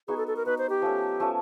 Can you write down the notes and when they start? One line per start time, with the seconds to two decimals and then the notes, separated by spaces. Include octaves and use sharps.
0.08 B3 D#4 F#4 G#4
0.17 A4
0.27 A4
0.36 A#4
0.46 B3 D#4 F#4 B4
0.58 C5
0.70 G4
0.82 F3 A3 C#4
1.20 F3 A3 C#4